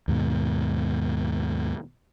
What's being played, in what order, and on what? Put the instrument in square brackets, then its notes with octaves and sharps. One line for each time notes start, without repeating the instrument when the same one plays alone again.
[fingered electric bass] D#2 G#2 B2